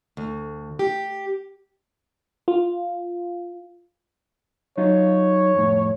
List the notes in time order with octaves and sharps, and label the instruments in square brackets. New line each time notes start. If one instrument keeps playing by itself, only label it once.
[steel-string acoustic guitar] D2
G4
[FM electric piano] F4
[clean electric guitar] F#3 D#4 F4 [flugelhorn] C#5
[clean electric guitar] F2 A2